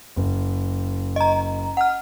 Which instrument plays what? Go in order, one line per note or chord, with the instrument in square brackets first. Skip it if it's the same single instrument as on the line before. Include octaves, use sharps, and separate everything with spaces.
[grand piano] F#1
[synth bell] D#5 A#5
F#5 F6